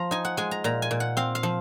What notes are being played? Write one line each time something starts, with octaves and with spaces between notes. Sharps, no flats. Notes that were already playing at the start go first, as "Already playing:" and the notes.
Already playing: F3 A#5 C6
D#4 G#5
F#5
G#3 G#5
A#5
A#2 A#5
G#5
A#2
F#5
C4 F5
F5
F3